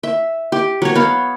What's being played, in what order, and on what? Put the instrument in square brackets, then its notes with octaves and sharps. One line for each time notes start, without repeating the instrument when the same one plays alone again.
[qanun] E5
G4
F#3 C#5
B3 F5